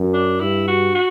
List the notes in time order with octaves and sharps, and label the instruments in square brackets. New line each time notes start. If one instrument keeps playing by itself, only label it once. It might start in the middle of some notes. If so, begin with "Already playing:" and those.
Already playing: [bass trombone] F#2
[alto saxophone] D4
[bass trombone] G2 [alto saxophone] E4
[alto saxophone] F#4
F#4